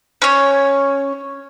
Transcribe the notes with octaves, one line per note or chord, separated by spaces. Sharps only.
C#4 C#5